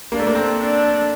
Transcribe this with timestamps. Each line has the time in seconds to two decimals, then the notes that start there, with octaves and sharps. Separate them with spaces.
0.12 A#3 D4
0.19 A3
0.27 A#3
0.35 C4
0.58 D4